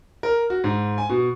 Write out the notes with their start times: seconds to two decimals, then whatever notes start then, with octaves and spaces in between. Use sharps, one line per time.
0.23 A#4
0.50 F#4
0.64 G#2
0.98 G#5
1.09 B2